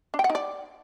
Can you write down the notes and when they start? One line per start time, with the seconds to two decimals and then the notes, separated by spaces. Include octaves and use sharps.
0.14 D4
0.19 G5
0.24 F#5
0.30 D#4
0.35 D5